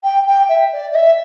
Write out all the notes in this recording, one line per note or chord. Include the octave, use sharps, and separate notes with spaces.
G5
G5
E5
D5
D5
E5